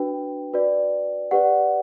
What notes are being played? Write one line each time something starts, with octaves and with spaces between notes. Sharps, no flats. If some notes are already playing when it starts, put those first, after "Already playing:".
Already playing: D4 F#4 B4 G5
F#4 B4 D5
G4 B4 D5 F#5